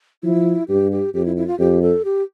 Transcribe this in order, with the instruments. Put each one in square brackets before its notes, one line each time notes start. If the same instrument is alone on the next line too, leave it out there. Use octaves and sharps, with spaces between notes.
[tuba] F3 [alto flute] E4
[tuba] G2 [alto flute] G4
[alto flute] G4
[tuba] F2 [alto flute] G4
[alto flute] E4
E4
F4
[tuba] F2 [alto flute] G4
[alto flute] A4
G4